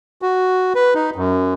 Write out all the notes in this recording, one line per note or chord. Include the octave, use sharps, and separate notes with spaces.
F#4
B4
D#4
F#2